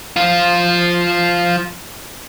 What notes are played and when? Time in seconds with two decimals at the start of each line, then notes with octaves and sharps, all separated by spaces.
0.16 F3 F4